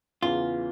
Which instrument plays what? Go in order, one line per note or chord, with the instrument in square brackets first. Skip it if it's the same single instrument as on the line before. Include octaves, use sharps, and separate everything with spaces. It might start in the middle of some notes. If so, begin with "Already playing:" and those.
[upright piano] E2 C#3 E3 [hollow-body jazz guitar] F4